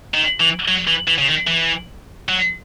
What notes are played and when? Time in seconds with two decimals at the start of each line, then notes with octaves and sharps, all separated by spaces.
0.14 D#3
0.40 E3
0.68 F#3
0.87 E3
1.07 E3
1.18 C#3
1.28 D#3
1.47 E3
2.29 F#3